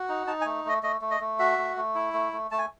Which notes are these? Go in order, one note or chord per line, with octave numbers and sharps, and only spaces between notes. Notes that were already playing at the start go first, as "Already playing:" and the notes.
Already playing: F#4
D#4
D#4 A5
G#5
A3
A3 D#5
A3 D#5
A3
D#5
A3
F#4 E5
A3
A3
E4
A3
A3
A3 A5
G#5